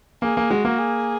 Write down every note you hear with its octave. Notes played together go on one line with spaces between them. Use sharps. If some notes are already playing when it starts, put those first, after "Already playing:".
A#3 G#4
A#3
G#3 F#4
A#3
G#4